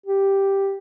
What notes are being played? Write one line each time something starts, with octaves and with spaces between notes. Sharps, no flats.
G4